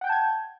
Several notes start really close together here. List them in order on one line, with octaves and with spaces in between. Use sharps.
F#5 G5 G6 A5 G#6